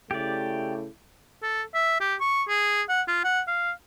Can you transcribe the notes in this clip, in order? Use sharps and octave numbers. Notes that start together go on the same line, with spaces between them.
C#3 A3 E4 G4 D5
A4
E5
G4
C#6
G#4
F#5
F4
F#5
F5